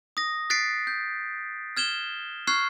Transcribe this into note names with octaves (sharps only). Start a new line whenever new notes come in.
D#6 A#6
F#6 A6 B6 C7 D7
G6
F6 G#6 E7 G7
C#6 F6 F#6 G#6 C7